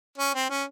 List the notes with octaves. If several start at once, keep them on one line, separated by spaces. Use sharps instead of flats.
C#4
C4
C#4